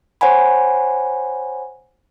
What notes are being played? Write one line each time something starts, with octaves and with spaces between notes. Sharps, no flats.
C5 C#5 F#5 G#5 B5